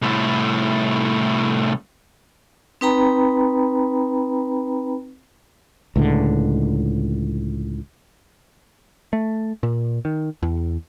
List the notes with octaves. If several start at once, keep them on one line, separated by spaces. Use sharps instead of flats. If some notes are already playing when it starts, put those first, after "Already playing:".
C2 A2
C4 D#4 B4 G5 A#5 B5
C#2 A2 D3
A3
A#2
D#3
E2